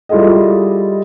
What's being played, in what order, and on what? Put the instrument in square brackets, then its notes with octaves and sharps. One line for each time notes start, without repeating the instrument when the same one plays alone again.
[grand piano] G3 E4 F4 G#4 A4 D#5